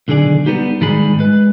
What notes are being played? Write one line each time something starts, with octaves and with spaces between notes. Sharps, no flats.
B1 D3 D#3 G#4 D5
G3 B3 D#4 G4
G#2 D#3 G3 G#3 G#4 B5
G#3 B4